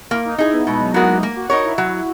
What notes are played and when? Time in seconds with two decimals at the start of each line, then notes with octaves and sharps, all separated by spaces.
0.11 A#3 E4
0.25 D#4
0.38 D#4 E4 G#4
0.53 B3
0.67 B2 G#3
0.80 F#3
0.94 F#3 G#3 B3 F#4 A#4
1.08 A#3
1.22 G#3 A#3
1.36 F#4
1.50 D#4 F#4 A#4 C#5
1.64 E4
1.78 F#3 F#4